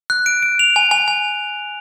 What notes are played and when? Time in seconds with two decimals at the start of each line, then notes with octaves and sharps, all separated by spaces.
0.10 F#6
0.26 D7
0.42 D7
0.59 F7
0.76 G#5
0.91 G#5
1.08 G#5